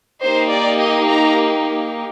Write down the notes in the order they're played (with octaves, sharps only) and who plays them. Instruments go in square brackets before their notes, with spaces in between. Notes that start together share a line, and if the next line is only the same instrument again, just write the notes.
[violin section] A#3 D#4 G4 C5
D5
D#5
A#5